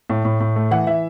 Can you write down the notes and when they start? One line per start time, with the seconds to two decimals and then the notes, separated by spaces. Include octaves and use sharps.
0.10 A2
0.25 A2
0.40 A2
0.56 A3
0.71 E3 F#5
0.87 E3 E5